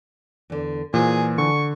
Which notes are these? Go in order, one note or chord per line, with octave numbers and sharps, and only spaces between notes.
E2 D3
A#2 E3 F4 G#4 C5
D3 C#6